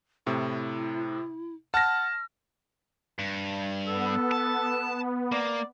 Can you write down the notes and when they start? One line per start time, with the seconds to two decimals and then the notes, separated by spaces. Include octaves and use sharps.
0.27 A2 C3 E4
1.74 F#5 A5 F6 A#6
3.19 G2
3.87 B3 A4
4.31 A5
5.32 A#3 D5